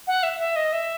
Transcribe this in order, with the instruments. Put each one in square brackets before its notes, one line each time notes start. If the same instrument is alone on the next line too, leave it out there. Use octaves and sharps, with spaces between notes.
[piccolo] F#5
E5
E5
D#5
E5